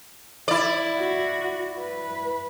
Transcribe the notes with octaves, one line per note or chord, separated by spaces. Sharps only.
E4 D5
F#4
B4